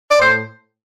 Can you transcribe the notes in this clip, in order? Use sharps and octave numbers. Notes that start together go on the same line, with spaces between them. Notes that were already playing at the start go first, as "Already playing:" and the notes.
D5
A2 C5